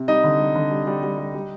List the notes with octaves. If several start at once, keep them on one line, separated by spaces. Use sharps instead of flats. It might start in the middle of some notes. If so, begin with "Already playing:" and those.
Already playing: C3
G3 D#4 D#5
D3
G3
D3
G3
G3
G3
G3
G3